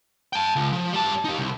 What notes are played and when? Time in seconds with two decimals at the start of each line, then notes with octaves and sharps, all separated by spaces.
0.33 G5 A5
0.56 C#2
0.73 F3
0.93 G3 A5
1.24 D#4 G4
1.38 C2